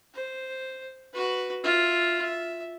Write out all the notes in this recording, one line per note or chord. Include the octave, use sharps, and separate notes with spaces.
C5
F#4 B4
F4 E5
E5